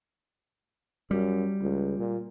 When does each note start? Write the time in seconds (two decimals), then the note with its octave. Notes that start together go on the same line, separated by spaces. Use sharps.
1.11 F#2 G3
1.61 C#2
1.98 A#2